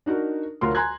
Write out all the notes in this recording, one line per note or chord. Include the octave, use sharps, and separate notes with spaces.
D4 D#4 F#4 A#4
D2 F#3 F4 F#4 A#4 C6
G#5 A#5 C6 F#6 G#6